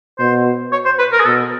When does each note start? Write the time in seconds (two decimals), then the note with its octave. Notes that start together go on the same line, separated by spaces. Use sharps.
0.19 B2 C5
0.72 C#5
0.85 C5
0.99 B4
1.12 A#4
1.20 G#4
1.26 B2 A4